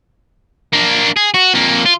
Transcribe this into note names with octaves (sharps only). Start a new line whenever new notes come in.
A#3 D4
G#4
F#4
F2 A#3
F4